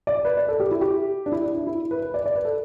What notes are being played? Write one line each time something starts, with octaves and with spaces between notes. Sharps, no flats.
D5
B4
D5
A4
G4
E4
G4
D4
E4
D4
D4
E4
B4
B4
D5
D5
B4
A4